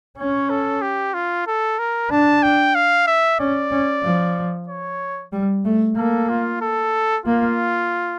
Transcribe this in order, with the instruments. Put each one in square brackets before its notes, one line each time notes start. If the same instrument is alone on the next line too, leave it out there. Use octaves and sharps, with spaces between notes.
[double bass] C#4 [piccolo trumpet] C#5
[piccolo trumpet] A4
G4
F4
A4
A#4
[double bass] D4 [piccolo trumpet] A5
[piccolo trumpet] G5
F5
E5
[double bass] C#4 [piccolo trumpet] D5
[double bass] C#4
F3
[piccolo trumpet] C#5
[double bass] G3
A3
[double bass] A#3 [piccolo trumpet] A4
[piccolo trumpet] F4
A4
[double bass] A#3 [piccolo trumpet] F4